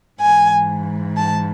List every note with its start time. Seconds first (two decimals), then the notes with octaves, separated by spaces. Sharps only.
0.21 G#2 E3 G#5
1.16 A5